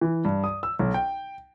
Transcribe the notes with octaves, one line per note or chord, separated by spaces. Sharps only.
E3
G2
D#6
E6
B1
G5